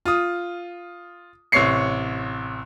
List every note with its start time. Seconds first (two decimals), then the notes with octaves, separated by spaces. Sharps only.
0.05 F4 D#6
1.52 A1 C3 C#5 C#6 C7 C#7